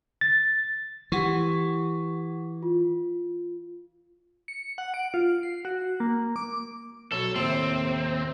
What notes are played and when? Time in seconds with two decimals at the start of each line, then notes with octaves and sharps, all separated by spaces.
0.21 A6
1.12 E3 G4 F#5 C#6
2.63 F4
4.48 C#7
4.78 F#5
4.94 D7
5.14 F4
5.43 C7
5.65 F#4
6.00 A#3
6.36 D6
7.12 B1 A4 C#5
7.36 D#2 A2 C3 A#3 C4